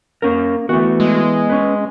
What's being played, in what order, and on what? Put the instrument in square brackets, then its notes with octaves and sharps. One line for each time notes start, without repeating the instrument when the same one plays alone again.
[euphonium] A#3 [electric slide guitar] C#4 A#4
[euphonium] E3 [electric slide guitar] A3 F#4 [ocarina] B3
[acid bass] G#3
[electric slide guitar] C#4 B4